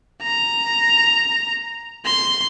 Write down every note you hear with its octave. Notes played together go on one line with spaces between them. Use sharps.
A#5
C6